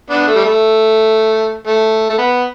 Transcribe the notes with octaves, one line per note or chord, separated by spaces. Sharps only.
B3 D4
A3
G3
A3
A3
A3
B3